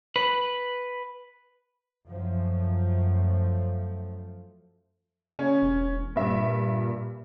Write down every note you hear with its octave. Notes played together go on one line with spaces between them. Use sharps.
B4
F#2 F3 A3
C#3 C#4
E1
G2 A#2 G3 E5